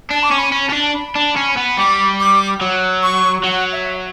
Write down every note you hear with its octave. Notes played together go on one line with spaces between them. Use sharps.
D4 A5
D6
C#4 C#6
B5
C#4
C#4 A5
D4
B5
D4
C#4
B3
G3 D6
D6
F#3
C#6
F#3 F#5
E5